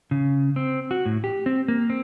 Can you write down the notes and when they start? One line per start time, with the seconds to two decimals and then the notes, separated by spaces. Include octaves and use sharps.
0.11 C#3
0.56 C4
0.91 F#4
1.06 A2
1.24 G4
1.46 C4
1.68 A#3
1.90 C4